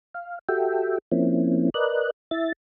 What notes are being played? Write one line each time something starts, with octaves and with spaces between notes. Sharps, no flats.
F5
F#4 G4 A4 E5 G5
F3 A#3 C4 C#4 E4
A#4 B4 D5 D#5 F#6
E4 E5 A6